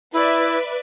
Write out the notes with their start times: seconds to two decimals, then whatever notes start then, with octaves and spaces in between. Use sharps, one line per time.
0.13 E4 B4 D5 E5